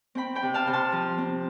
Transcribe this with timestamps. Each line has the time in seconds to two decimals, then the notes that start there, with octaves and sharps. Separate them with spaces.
0.15 C4 G5 B5
0.35 G5 B5
0.42 C3
0.54 F5 A5
0.67 C3
0.73 A5 C6
0.92 F3
1.18 C4